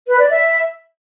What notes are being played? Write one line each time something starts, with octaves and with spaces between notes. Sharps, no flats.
B4
D5
E5